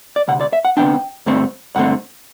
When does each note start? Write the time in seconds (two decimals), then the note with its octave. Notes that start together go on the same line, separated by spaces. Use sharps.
0.16 D5
0.28 D2 C3 F#5
0.41 D5
0.53 E5
0.65 F#5
0.77 D2 C3 E3 B3 D4 G5
1.26 G2 D3 A3 C4
1.76 G2 D3 A3 C4 F#5